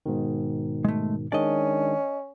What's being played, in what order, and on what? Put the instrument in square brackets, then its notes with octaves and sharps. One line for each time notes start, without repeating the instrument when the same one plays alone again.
[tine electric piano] G#2 B2 D#3
[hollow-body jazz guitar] G#3 A3
[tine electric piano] D#3 G#3 D4 [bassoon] C#4 [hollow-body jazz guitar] D5 D#5